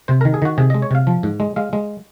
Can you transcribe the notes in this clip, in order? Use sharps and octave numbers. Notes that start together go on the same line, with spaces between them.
C3 C5
D#3 A#4
G#4
D#3 F#4
C3 G#4
G#3 D#5
C#5
C3 F5
F3
G#2
G#3
G#3 F5
G#3